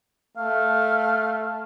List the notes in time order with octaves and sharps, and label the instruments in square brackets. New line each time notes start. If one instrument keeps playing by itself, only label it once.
[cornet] A3 [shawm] F5